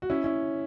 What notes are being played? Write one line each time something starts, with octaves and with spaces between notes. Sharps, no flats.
F#4
C#4 E4
C#4 E4